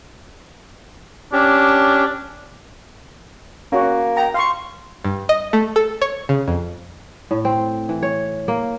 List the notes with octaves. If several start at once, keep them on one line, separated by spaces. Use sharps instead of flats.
C#4 D4 G4
A#3 C#4 F#4
G5 A#5
F5 C6 C#6
G2
D#5
A3
A4
C#5
C#3
F2
A2
C4
E3
C#5
A#3